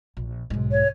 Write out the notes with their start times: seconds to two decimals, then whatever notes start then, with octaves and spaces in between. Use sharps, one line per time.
0.17 A#1
0.50 B1 G#2
0.71 C#5